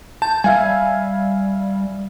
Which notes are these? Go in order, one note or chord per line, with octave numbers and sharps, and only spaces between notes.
A5 G6
G3 E5 F5 G#5